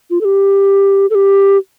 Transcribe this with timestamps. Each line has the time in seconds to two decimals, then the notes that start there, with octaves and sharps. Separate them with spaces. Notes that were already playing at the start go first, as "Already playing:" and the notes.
0.10 F4
0.21 A4
0.25 G4
1.10 A4
1.15 G4